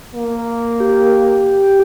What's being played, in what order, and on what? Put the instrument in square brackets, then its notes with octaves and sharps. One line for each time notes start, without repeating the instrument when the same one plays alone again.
[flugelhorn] A#3
[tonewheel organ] G4